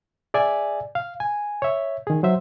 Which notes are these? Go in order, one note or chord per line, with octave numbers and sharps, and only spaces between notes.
G#4 D5 E5 G#5
F5
G#5
C#5 E5
D#3 G#4
F#3 C5 E5